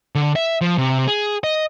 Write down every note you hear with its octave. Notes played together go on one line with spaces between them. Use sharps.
D3
E5
F3
C3
G#4
D#5